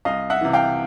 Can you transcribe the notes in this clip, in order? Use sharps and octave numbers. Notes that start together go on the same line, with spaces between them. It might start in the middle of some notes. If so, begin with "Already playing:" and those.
C2 D#5 F5
E5 F#5
C3 E3
F5 G5